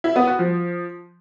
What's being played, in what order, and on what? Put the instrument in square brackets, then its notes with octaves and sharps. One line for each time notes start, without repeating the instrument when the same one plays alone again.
[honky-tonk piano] E4
B3
F#4
F3